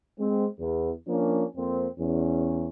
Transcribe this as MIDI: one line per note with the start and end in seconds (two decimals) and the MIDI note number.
0.19 0.46 56
0.19 0.46 60
0.59 0.91 40
1.08 1.44 53
1.08 1.44 58
1.08 1.44 61
1.08 1.44 62
1.56 1.86 41
1.56 1.86 58
1.56 1.86 60
1.98 2.68 40
1.98 2.68 61